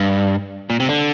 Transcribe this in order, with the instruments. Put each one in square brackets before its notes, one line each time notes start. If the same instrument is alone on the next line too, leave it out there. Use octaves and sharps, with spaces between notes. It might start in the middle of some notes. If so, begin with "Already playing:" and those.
Already playing: [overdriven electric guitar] G2
A#2
C3
D3